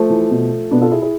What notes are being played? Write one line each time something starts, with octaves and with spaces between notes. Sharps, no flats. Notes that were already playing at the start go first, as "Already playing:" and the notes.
Already playing: F3 A3
E3
B2
B2 B3 D4
F4 A4
E4 G#4
E4 G#4